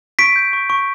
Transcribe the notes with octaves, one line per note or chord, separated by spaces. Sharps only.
C#6 B6 D7
G6
C#6
C#6